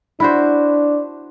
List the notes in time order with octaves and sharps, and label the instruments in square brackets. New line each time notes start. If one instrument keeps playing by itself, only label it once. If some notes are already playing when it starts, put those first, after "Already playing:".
[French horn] D4 [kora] E4 F#4 C5